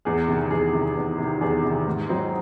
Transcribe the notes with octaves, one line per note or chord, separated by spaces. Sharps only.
E2 G#4
C3 D#3
E2 G#4
C3 D#3
E2
C3 D#3
E2 G#4
C3 D#3
G#2
F#3 C4 D#4